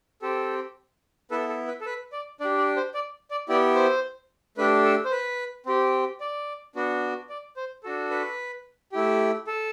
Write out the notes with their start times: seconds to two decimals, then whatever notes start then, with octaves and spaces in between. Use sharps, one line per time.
0.22 C4 G4 A4
1.31 B3 E4 A4 B4
1.49 A4
1.68 B4
1.81 A4
1.86 B4
2.12 D5
2.40 D4 D5
2.45 G4
2.58 D5
2.77 C5
2.94 D5
3.31 D5
3.49 B3 E4 G4 D5
3.75 C5
4.58 A3 D4 G4 B4
4.84 A4
5.05 C5
5.11 B4
5.66 C4 G4
6.20 D5
6.75 B3 D4 F#4
7.30 D5
7.57 C5
7.83 D4 F#4 A4
8.11 B4
8.92 A3 E4 G4
9.47 A4